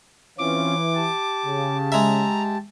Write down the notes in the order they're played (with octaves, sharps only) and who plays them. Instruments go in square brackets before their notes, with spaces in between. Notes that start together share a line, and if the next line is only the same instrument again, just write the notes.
[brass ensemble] E3 [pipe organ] C4 C#4 F4 [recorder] D6
[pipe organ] G4 A5
[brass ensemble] C#3
[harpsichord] G#3 E5 [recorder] A#5